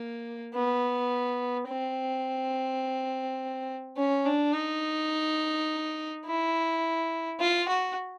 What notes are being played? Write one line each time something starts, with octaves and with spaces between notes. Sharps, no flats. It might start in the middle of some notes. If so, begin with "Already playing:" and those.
Already playing: A#3
B3
C4
C#4
D4
D#4
E4
F4
F#4